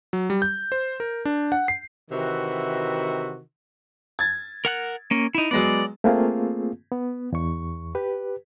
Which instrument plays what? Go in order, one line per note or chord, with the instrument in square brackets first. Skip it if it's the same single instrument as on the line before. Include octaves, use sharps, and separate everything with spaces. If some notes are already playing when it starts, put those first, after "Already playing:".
[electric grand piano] F#3
G3
G6
C5
A#4
D4
F#5
C7
[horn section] C3 D#3 E3 F#4
[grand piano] G#6 A6
[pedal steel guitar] A#4 F#5 F#6
A#3 C#4
D#4 E4
[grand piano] F#3 G#3 B3 [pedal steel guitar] D5
[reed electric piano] A3 A#3 C4 F4 G#4
B3
E2 C#6
G4 B4